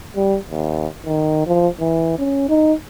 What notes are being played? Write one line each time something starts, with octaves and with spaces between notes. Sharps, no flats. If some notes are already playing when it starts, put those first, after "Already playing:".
G3
D#2
D#3
F3
E3
C#4
D#4